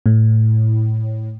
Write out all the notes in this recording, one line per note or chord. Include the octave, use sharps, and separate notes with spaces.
A2